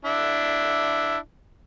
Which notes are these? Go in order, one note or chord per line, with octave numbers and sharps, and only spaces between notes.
D4 E4